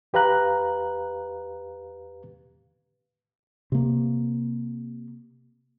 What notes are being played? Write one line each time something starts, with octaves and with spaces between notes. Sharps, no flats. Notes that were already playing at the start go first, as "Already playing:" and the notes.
E2 G4 B4 F5 A#5 F#6
C3 A#3